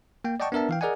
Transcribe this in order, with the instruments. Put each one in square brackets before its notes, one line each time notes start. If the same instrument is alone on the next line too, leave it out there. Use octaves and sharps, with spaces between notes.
[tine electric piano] A#3 G5
D5 D#5 F#5 G5 A5 C#6
B3 D4 A#4 E5 A5
E3 F5 G5
G#4 A#4 D5 D#5 F#5 G#5